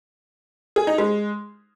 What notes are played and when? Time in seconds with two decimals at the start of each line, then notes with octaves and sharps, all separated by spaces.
0.76 G#4
0.87 D#4
0.98 G#3